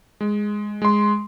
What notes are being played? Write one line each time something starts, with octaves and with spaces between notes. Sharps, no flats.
G#3
G#3 C6